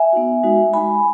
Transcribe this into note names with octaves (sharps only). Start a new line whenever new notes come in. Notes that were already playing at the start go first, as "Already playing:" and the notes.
Already playing: E5 G#5
B3 D#4 F#4
G#3 D#4 F#4
G#3 D#4 F#4 G#5 B5